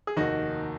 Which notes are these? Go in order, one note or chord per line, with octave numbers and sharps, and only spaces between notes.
G#4
F1 D#2 D#3 A#3 D#4 F#4